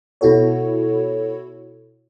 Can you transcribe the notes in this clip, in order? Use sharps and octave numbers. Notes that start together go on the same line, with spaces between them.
B2 E4 F#4 A4 C#5